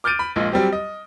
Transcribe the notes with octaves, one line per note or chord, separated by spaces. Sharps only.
D6 F6 G6 A6 D7 D#7
B5
A#1 A#2 G#3
F#3 G3 C4 G4
D#5